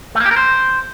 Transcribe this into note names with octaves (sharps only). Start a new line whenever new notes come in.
A3
A#3
G4
A#4
C5